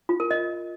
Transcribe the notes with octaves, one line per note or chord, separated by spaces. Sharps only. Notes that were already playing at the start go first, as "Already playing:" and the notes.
F4
A#4
D#5